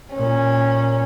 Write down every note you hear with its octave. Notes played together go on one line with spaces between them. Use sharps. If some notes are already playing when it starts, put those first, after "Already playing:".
A#2 C#4